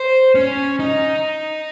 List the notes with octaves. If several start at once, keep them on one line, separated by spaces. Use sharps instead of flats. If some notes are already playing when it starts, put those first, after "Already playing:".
Already playing: C5
C#4
D#4